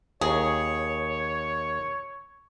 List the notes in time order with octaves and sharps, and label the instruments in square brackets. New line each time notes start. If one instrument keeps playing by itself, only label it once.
[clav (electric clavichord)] D#2 [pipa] G#4 [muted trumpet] C#5